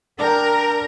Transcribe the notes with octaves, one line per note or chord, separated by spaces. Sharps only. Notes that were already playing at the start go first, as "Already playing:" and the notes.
D4 A#4 G5